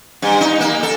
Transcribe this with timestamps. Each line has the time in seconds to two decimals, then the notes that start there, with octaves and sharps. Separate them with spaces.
0.22 G2
0.41 D#4
0.61 A#3
0.83 A4